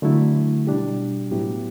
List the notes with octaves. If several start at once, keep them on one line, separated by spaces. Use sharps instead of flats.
D3 F#3 A3 E4
B2 G3 D4 G4
A2 F#3 B3 E4 G4